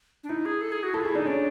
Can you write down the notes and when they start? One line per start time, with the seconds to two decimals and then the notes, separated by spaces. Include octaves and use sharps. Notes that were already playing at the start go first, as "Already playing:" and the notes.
0.23 D4
0.29 D#4 E4
0.45 G#4
0.61 A4
0.72 G#4
0.83 F#4
0.94 E4 A4
1.01 F4
1.05 E4 G#4
1.15 D4 D#4
1.26 C#4 D4